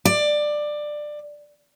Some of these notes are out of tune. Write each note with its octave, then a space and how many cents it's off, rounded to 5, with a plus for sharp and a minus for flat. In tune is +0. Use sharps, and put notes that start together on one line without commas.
D5 +15